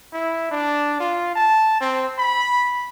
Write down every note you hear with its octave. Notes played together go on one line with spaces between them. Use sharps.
E4
D4
F4
A5
C4
B5